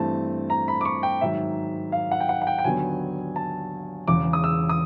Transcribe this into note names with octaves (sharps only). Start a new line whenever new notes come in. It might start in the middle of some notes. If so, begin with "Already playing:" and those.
Already playing: G2 E3 A3 C4 A5
A#5
B5
D6
C#6
G5
G#2 D#3 F#3 E5
F5
F#5
G5
F#5
F#5
G5
G5
D#2 D3 F#3 B3 G#5
A5
E1 E2 C#3 D6
D#6
E6
D#6